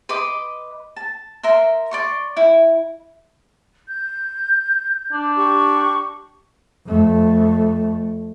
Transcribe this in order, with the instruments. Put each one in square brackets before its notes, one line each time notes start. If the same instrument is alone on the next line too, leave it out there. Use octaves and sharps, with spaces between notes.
[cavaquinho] B4 D#5 C6 D6
A5
A#4 E5 C6
D5 C6 C#6
E4
[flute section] G6
[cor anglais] D4
[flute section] G4 C#6
[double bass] F2 A3